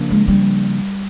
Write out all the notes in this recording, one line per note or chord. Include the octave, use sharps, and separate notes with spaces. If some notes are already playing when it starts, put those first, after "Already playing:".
Already playing: C#3 F3 A#3 D4
G#3
G3